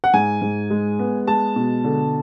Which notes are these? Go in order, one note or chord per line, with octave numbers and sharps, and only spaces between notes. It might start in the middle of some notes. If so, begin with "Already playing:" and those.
F#5
G#2 G#5
G#2
G#3
B3
G#3 A5
B2
D3